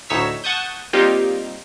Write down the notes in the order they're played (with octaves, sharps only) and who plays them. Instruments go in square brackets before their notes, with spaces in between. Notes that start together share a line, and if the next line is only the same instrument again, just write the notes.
[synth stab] D2 A2 D#4 C#5 E6 B6
F#5 A5 C#6 D#6 G6
G3 A#3 C4 D#4 F4 G4